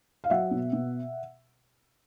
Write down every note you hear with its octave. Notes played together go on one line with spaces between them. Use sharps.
F5
F#3 E5 F#5
B2
B2